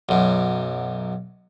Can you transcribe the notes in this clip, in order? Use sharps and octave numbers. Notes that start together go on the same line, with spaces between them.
B1 F#2